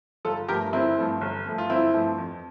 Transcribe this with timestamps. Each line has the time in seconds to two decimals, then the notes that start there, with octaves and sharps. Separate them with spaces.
0.25 G1 F4 A4
0.48 G2 F3 A3 G4 A#4
0.73 G1 C4 E4
0.97 G2 F3 A3
1.21 G1
1.45 G2 F3 A3
1.58 F4
1.70 G1 C4 E4
1.94 G2 F3 A3
2.18 F2